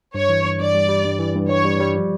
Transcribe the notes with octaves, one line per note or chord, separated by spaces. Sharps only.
G2 C#5
E3
G2
G2 D5
G3
G3
G2
E3
G2
G2 C#5
G3
G3
F3